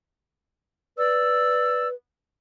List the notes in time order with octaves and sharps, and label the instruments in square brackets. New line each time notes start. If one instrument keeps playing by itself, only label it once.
[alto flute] B4 [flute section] D5 E6